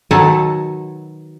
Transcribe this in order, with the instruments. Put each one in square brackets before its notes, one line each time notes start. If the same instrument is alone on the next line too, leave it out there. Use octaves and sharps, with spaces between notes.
[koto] B2 D#3 F#3 A4 F#5 G#5